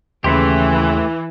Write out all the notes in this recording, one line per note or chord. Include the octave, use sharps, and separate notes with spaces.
D#2 C#3 E3 A3 G4 C6 B6